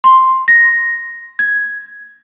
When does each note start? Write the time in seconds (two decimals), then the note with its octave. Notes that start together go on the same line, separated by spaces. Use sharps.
0.04 C6
0.48 A#6
1.39 G#6